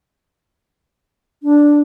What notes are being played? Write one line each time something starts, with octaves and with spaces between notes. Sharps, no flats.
D4